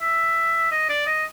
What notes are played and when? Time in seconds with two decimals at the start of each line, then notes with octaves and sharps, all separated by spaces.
0.02 E5
0.71 D#5
0.89 D5
1.07 D#5